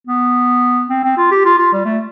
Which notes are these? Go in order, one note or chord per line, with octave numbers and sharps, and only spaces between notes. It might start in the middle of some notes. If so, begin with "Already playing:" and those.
B3
C4
C4
F4
G4
F4
F4
G3
A3